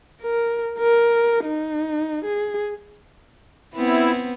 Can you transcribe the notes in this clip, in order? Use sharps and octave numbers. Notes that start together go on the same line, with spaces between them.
A#4
A#4
D#4
G#4
B3 C4 E4